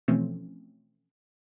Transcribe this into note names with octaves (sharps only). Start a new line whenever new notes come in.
B2 E3 F3 A3 C4 C#4